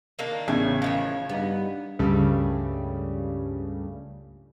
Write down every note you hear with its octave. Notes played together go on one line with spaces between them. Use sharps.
D#3 A#3 D4
A1 C#3 B3 E5 G#5 G#6
D#3 F3 C#5 F5
G2 G3 B3 D#4
C#2 G2 C#3 G3 A3